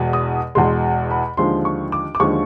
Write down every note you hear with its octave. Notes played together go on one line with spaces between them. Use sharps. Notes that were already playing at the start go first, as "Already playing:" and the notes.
Already playing: E2 B2 G#3
D#6
E2 B2 G#3 C6
B5
D#2 D3 F3 G#3 C6
C#6
D6
D6
D#2 D3 F3 G#3 C#6